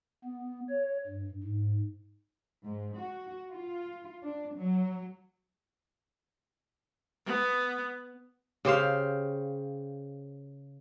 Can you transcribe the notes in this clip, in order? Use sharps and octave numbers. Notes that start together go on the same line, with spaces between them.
B3
C#5
G2
G#2
G#2
F#4
F4
D4
F#3
B3
C#3 G4 C5 F5